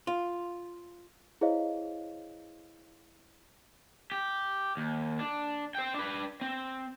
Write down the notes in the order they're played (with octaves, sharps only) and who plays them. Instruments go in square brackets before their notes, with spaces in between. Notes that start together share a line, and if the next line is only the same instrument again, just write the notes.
[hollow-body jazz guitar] F4
[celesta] E4 G#4 C5 C#5 D#5 F5
[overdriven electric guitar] G4
D#2
D4
C5 G5
D4 B4
C4